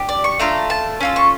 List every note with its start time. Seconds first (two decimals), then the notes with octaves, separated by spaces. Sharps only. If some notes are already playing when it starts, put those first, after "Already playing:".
Already playing: D4 G4
0.09 D5
0.24 C#6
0.39 A3 D4 F4 A4 A#5
0.70 A5
1.00 C#4 F4 A4
1.16 C#6